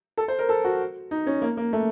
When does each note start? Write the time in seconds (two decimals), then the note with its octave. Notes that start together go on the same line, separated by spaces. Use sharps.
0.17 A4
0.28 C5
0.39 A#4
0.49 A4
0.64 F#4
1.11 D#4
1.27 C#4
1.42 A#3
1.57 A#3
1.73 A3